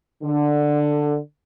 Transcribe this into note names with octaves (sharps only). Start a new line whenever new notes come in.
D3